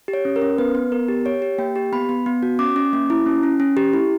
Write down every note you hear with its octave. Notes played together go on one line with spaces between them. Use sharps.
G4
C#5
C#4
A#4
C#4
B3 B4
B3
B3 A#4
G4
G4 C#5
G4
A#3 G5
G4
B3 B5
B3
B3
F#4
C#4 D6
C#4
A#3
E4
C#4
C#4
C#4
G4
E4